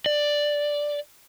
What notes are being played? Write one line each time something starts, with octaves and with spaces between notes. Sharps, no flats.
D5